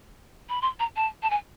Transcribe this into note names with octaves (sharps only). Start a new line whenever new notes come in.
B5
C6
A#5
A5
A5
G#5